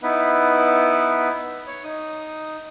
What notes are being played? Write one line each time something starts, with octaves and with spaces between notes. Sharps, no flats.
B3 D#4 E4 B4
C#5
D#4 D#6